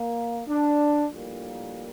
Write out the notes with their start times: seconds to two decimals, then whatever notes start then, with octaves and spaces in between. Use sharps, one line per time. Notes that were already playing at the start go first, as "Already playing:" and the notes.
Already playing: A#3
0.48 D4
1.12 A#1 A2 G3 A#3